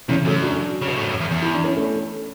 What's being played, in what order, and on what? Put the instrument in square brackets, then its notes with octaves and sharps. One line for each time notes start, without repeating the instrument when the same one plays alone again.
[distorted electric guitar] E2 [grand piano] C#3 E3
[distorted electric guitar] F#2 [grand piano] F#3 A3
[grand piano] D4 F#4
[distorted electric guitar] C#3
B2
A2
G#2
F#2
E2
E2
[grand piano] E4
D4
C#4 E4
A3 C#4